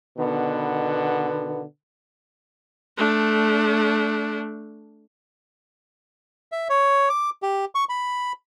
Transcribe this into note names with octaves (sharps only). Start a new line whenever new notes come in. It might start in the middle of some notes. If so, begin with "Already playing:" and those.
B2 D3 D#3 B3
A3 D4
E5
C#5
D6
G4
C#6
B5